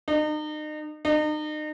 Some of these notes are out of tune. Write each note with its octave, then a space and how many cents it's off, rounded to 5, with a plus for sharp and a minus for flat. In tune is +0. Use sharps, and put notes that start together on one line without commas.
D#4 -35
D#4 -35